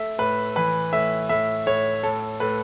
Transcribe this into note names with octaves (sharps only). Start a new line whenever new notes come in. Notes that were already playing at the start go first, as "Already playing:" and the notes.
Already playing: A3 E5
A2 B4
E3 B4
A2 E5
A2 E5
A2 C#5
A2 A4
A2 B4